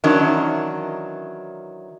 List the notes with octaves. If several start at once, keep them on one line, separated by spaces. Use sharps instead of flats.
D#3 E3 F#3 C#4 D4